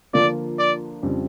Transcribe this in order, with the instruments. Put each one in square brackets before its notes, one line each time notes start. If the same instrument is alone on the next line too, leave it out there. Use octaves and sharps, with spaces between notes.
[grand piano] D3 F3 A#3 D4 F4 [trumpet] D5
[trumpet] D5
[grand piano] F2 C#3 G3 D4